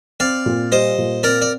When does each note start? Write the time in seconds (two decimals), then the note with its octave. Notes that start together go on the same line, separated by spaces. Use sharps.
0.20 C4 D5 F5
0.46 A#2
0.72 G3 C5 D#5
0.98 A#2
1.23 C4 A#4 D5
1.42 D5